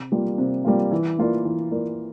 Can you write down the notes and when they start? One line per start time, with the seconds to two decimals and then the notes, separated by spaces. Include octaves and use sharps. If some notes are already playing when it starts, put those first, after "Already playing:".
Already playing: C3
0.12 G3 A#3 F4
0.38 C3
0.65 G3 A#3 F4
0.91 E3
1.19 A#3 F4 A#4 D5
1.45 E3
1.72 A#3 F4 A#4 D5